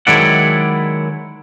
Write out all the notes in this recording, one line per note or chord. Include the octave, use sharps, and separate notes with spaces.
D#3 F#3 G#3 E4 D5 F#5